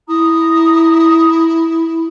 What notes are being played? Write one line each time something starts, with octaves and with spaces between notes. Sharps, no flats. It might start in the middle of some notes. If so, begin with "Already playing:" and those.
E4 A#5 D#6